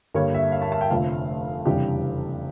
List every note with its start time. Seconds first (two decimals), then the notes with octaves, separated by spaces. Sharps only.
0.14 G2 D3 G3 A#3 C#5
0.34 E5
0.52 F5
0.62 A5
0.72 A5
0.81 G5
0.90 F1 F2 D3 A3 F5
1.66 F1 E2 C#3 G3 D4 G4